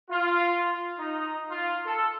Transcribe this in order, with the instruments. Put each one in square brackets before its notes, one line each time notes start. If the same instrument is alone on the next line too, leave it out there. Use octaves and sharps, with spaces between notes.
[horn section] F4
D#4
F4
A4